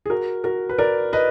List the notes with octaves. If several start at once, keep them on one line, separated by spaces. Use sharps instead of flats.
G#4
F#4 A#4
F#4 A#4
B4
A#4 D5
B4 D#5